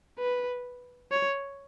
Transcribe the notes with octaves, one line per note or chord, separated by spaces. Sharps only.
B4
C#5